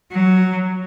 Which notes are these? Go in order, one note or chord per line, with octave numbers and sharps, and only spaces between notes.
F#3